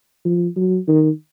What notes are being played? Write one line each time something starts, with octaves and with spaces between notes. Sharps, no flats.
F3
F#3
D#3